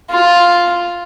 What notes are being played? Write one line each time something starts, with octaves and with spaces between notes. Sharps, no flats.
F4